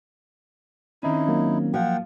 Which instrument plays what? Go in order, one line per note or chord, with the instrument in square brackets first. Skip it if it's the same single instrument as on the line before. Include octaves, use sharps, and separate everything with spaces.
[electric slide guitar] D#3 C4 C#4 [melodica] D#4 E4
[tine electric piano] F#3 A#3
[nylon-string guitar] F3 [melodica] F#5 G5